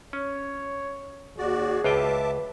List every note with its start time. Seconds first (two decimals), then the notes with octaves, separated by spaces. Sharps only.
0.13 C#4 C#5
1.38 D#2 F#4 G#4 D5
1.84 C#2 F4 B4 E5 G5 A5 D6